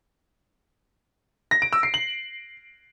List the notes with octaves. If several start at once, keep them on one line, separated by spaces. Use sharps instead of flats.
A#6
D7
E6
C7
F#7